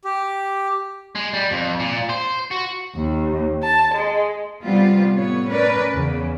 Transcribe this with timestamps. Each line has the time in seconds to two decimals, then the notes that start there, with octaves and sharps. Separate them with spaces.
0.05 G4
1.15 G#3
1.33 G3
1.51 F2
1.80 A#2
2.10 C5
2.51 F#4
2.96 D#2
3.64 A5
3.96 G#3
4.63 C3 G3 B3 C4 F4
5.14 A2 B3 C#5
5.48 C#4 A#4 B4 D5
5.93 E2 C#3